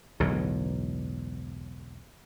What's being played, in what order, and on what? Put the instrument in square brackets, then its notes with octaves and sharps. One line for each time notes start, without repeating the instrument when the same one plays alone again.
[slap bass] E1 B1 A2 D3